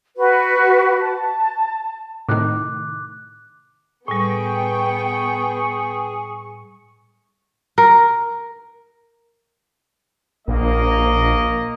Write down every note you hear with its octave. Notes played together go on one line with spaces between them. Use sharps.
F#4 B4
A5
A2 C3 D#3 D6 F#6
A2 G3 B3 G#4 G5 C#6
A#4
A#1 A#3 D#5